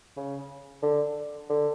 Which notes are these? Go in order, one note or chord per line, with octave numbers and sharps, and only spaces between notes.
C#3
D3
D3